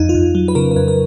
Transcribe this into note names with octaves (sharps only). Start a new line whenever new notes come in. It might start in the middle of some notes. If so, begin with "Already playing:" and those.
Already playing: F2 D#4
F4
F2
F#3
B4
C#3 A#4
A#4
F2 B4
A#4